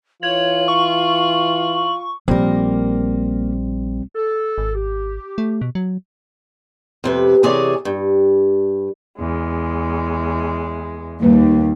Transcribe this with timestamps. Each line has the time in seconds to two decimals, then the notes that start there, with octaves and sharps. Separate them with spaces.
0.23 E3 F4 C#5 F#7
0.68 C#6
2.28 A#1 G3 A#3 C4 A#4
4.15 A4
4.58 G#1
4.75 G4
5.38 A3
5.61 B2
5.75 F#3
7.04 F2 C3 B4
7.43 C3 E3 G#4 A#4 C#5 D5
7.85 G2
9.17 E2 G#3
11.23 D#2 G3 A#3 B4